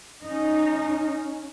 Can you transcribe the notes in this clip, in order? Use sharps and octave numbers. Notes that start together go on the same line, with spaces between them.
C#4 D#4